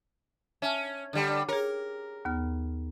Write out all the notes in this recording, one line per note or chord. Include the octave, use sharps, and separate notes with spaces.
C#4 E5 A5 F6
D3 G3
G#4 A#4 C#5
D#2 B3 F6